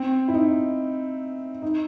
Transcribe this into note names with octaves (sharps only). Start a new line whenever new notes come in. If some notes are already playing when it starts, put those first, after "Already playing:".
Already playing: C4
E4
D#4
D#4